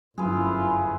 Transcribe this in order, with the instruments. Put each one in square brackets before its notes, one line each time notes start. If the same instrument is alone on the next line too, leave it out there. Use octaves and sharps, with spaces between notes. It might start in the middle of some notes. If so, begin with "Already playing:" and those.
[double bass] G1 E4 [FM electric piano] F#2 [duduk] F4 [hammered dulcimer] G#4 B4